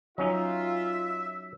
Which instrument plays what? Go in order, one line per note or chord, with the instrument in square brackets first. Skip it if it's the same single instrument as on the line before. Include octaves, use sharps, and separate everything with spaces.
[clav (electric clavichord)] F#3 C#4 D#4 [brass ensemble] F4 [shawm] E5